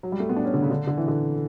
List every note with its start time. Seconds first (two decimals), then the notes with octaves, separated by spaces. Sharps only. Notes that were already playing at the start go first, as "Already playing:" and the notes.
0.03 F#3
0.12 G3
0.20 A3
0.29 B3
0.36 D4
0.45 C#4
0.54 D3
0.62 C#3
0.71 D3
0.87 D3
0.97 E3
1.08 D3